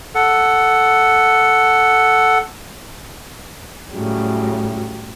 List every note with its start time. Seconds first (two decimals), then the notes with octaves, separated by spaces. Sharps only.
0.15 A4 F#5
3.94 A2 C#3 F#3 G3